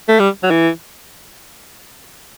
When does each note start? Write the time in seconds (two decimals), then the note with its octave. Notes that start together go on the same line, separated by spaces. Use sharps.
0.08 A3
0.19 G3
0.43 F#3
0.51 E3